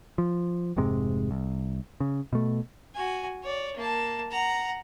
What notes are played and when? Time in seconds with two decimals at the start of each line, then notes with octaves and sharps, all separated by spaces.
0.18 F3
0.77 F1 G#2 C3 G#3
1.31 C2
2.00 C#3
2.33 B2 A3
2.95 F#4 G#5
3.43 C#5 D5
3.76 A#3 A5
4.31 F#5 A#5